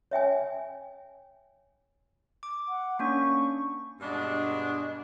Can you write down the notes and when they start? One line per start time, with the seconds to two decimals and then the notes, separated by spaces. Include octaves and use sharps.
0.11 C#5 E5 G5 G#5
2.43 D6
2.68 F#5
2.99 A#3 C#4 D4 C#6
4.00 G2 B2 G#3 D4